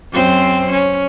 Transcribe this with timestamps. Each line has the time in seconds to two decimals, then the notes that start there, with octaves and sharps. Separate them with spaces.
0.12 F#2 C4 C5
0.71 C#4